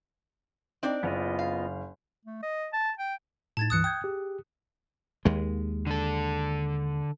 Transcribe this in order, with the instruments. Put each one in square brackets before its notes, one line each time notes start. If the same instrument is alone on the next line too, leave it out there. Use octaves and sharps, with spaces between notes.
[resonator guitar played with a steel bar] C4 D4 D5 [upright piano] D#4 G5
[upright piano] F#1 [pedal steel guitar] B3 F4 D#5
[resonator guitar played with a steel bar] F5
[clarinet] A3
D#5
A5
G5
[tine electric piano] A2 D#4 [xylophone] A5 G#6 A6
[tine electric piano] C#2 G2 E3 [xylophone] D#6 F#6 C#7
[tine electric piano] G5 G6 G#6 [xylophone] D#6
[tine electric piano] G4 G#4
[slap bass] D#2 G#3
[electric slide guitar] D3 A4